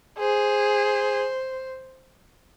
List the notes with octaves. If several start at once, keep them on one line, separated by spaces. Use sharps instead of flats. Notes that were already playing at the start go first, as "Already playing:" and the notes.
G#4 C5